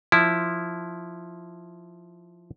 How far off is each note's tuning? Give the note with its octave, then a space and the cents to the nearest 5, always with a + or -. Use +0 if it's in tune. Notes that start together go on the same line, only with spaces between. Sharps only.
F3 +0 E4 +0